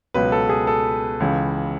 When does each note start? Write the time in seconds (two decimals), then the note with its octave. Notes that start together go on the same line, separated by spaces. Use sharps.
0.14 C#2 B2 F#3 B4
0.32 A4
0.49 G#4
0.67 A4
1.20 C#2 C#3 E3